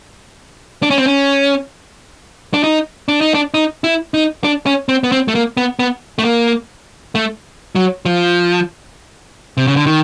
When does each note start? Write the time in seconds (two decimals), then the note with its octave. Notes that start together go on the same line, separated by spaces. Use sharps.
0.82 D4
0.90 C#4
0.98 C4
1.06 C#4
2.54 D4
2.64 D#4
3.08 D4
3.21 D#4
3.34 D4
3.54 D#4
3.84 E4
4.14 D#4
4.44 D4
4.66 C#4
4.89 C4
5.04 B3
5.12 C4
5.28 A3
5.35 A#3
5.57 B3
5.79 B3
6.19 A3
6.24 A#3
7.15 A3
7.75 F#3
8.05 F3
9.57 C3
9.67 C#3
9.76 D3
9.86 D#3